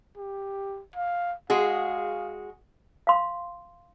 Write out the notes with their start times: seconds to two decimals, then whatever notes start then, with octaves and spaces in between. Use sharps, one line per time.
0.17 G4
0.96 F5
1.50 G#3 F#4 G#4 F5
3.07 F5 C6